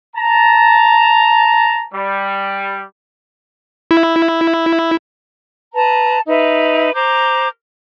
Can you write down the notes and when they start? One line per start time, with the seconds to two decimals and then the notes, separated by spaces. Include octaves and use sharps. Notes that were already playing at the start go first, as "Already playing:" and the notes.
0.15 A5 A#5
1.93 G3
3.91 E4
5.74 B4 A5 A#5
6.27 D#4 B4 E5
6.94 C5 A#5 D6 G6